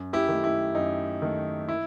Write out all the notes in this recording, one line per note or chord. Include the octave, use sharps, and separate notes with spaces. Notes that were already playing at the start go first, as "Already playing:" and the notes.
Already playing: F#2
E4 G4
D#3 A3
E4
F#2 D#4
D#3 A3
E4